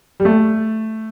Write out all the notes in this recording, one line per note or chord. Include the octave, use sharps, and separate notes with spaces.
G3
A3